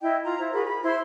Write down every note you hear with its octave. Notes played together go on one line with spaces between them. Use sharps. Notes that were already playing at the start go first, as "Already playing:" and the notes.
E4 D#5 G5
F4 A#5
E4 C5
F#4 G#4 A#4 B5
B5
E4 C5 C6